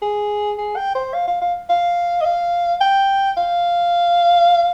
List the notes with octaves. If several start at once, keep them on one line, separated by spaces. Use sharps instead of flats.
G#4
G#4
G5
C5
F5
F5
F5
F5
D#5
F5
G5
F5